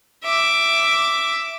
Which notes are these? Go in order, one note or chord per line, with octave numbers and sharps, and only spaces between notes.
E5 D6